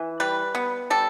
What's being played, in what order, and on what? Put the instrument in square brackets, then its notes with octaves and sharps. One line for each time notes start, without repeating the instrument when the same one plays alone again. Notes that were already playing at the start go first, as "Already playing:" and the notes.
Already playing: [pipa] E3
G3 B4
B3
G3 A4